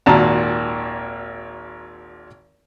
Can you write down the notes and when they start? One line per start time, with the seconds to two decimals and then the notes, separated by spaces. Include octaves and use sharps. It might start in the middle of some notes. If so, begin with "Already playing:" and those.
0.06 G#1 D#2 A#2 F#4 A5 A#5